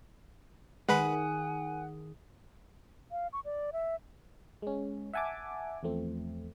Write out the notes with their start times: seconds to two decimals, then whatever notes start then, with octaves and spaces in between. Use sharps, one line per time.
0.89 D#3 G#3 G#4 B4 F#5 G#5 B5
3.11 F5
3.33 C#6
3.45 D5
3.73 E5
4.62 G#3 C#4
5.13 E5 F#5 G#5 A5 D6
5.83 E2 F3 A3 C4